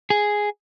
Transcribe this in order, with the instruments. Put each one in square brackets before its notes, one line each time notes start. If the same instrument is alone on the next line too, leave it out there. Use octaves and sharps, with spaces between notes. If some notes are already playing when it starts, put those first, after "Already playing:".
[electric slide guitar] G#4